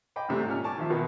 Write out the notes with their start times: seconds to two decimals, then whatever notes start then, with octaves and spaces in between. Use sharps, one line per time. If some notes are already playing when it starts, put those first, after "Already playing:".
0.16 D#5 G5 B5 D6
0.29 G#2 C3 G3 A3
0.46 A#2 C#4 F6
0.64 G#5 A5 C#6 D6
0.78 D#3 F3 E5
0.90 B2 D#3 B3